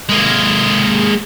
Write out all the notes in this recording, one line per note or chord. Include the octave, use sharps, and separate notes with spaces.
G#3 A#3